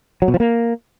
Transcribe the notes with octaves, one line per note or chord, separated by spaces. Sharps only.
F#3
B2
F3
A#3